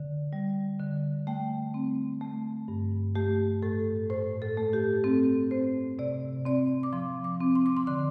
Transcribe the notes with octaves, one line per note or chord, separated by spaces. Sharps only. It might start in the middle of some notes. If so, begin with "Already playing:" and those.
Already playing: D3
G3
D3
A3 G5
C4
A3
G2
A3 G4
A2 A4
A2 C5
A4
A3
G4
C4 A4
C4 C5
C3 D5
C4 D5
D6
F3 C6
D6
C4
C6
D6
C6
D3 C6